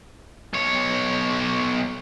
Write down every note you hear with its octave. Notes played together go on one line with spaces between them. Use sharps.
B1 C#5